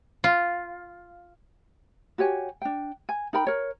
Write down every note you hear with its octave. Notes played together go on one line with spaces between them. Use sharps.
F4
F#4 G4 C#5 G#5
D4 G5
G#5
D#4 A#4 G5 B5
A#4 C#5